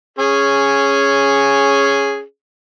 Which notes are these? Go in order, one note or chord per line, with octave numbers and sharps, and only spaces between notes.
C#4 G#4